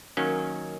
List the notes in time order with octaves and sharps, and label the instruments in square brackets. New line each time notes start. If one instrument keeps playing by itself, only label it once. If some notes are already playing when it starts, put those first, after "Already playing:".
[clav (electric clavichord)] D#3 F#3 A#3 C#4